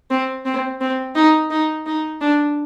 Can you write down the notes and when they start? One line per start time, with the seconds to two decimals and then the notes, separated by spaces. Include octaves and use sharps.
0.11 C4
0.45 C4
0.81 C4
1.15 D#4
1.50 D#4
1.86 D#4
2.21 D4